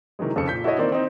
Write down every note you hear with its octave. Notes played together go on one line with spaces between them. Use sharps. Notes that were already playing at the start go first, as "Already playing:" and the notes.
C3 D#3 E3 F#3 G#3
F2 C#3 F3 A4 C#7
A#2 G6 B6
E4 F#4 A4 C#5 D#5
D#3 E3 A#3 C4 D5
C4 D#4